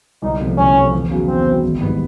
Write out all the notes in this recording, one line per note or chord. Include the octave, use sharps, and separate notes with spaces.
C2 D#4
C3 F3 A3
C2 C#4
C3 F3 A3
E2
C#3 F#3 B3
E2 C4
C#3 F#3 B3
G#1
G#2 E3 G3 B3